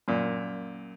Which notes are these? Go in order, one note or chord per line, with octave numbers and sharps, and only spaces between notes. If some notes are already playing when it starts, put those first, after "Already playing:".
F#2 A#2